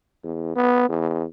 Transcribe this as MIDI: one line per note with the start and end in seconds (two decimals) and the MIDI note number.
0.23 0.51 40
0.55 0.88 59
0.89 1.24 40